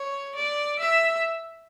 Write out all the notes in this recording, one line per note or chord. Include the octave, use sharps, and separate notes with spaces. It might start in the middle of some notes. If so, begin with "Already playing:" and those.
Already playing: C#5
D5
E5